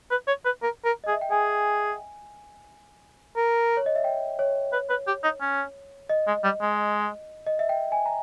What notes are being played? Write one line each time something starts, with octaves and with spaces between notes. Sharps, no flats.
B4
C#5
B4
A#4
A#4
G#4 D#5
E5
G5
G#4 G#5
A#4
C#5
D#5
E5
G5
C#5
B4
B4
G4
D#4
C#4
D#5
G#3
G3
G#3
D#5
E5
G5
G#5
A#5